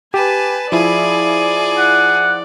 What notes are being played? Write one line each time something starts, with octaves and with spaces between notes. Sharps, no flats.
G4 B4 G#5 A5
F3 E4 G#4 D5
F#5